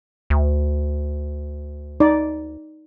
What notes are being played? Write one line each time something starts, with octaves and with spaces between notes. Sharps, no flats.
D2
D#4 D5